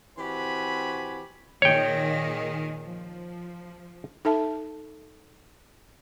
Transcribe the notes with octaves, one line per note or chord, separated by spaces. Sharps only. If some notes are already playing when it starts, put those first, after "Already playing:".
E3 C4 F#4 G4 G#5 B5
A#2 D#3 G#4 C#5 G5
F3
D#4 A4 E5 A5